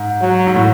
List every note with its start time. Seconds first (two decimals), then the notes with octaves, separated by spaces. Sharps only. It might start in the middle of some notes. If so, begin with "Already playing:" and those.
Already playing: G#2
0.21 F#3
0.47 G#2
0.56 A2